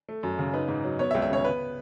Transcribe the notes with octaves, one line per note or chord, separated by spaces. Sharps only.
A3
F#2
C#3
D#4 B4
G#2
F#3
B3 C#5
E5
C#2
E5
C#3 C#5
B3 B4